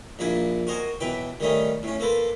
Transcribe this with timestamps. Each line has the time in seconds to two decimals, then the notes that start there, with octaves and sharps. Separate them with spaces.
0.19 A#1 A#3 D4 E4 G#5
0.67 F#4 A#4 C5 D#5 G#5 C#6
1.00 B1 E3 B4 G5
1.40 D#3 G3 A3 C#4 D#4
1.83 A2 C#4
2.00 A#3 A4 B4 C5